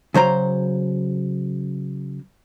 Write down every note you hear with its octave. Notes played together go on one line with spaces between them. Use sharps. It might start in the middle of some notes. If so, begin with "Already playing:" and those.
C#3 F#3 C5 A#5